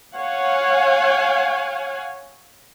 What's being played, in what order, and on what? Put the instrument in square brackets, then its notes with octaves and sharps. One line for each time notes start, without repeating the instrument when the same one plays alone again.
[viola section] C#5 F5 F#5 G#5